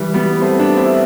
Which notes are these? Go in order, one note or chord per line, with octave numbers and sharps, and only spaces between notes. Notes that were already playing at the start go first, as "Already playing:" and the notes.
Already playing: E3 G3
G3 B3
A3 C4
B3 D4
C4 E4